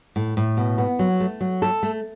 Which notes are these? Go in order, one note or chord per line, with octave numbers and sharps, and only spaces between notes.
A2
A2
B2
B3
F#3
A3
F#3
A4
A3